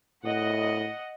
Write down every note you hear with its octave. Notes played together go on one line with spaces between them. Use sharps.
A2 D#5 F#5